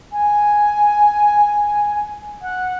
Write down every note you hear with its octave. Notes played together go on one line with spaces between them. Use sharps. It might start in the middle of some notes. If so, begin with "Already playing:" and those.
G#5
F#5